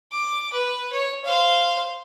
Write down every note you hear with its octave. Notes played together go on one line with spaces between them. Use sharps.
D6
B4
C#5
C5 F5